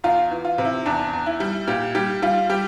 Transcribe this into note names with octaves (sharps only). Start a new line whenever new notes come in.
E2 F4
E3
F4
C3
E4
E2 D4
E2
E4
G3
A#2 G4
G3 G4
G3 F4
G3 G4